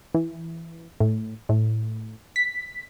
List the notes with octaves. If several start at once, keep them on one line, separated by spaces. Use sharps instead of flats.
E3
A2
A2
B6